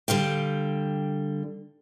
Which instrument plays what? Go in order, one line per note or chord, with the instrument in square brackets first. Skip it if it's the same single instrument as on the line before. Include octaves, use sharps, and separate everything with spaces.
[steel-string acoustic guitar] D3 G3 F5 G5